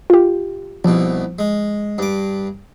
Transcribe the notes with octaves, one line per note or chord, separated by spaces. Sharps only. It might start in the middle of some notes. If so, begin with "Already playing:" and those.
F4 G4
C2 B2 F3
G#3
G2 D6